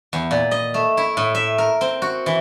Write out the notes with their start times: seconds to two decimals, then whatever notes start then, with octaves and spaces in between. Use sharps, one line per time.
0.13 E2
0.31 A#2
0.51 D#5
0.74 A3
0.97 E4
1.17 A2
1.35 E5
1.58 A#4
1.81 C4
2.02 F#4
2.26 E3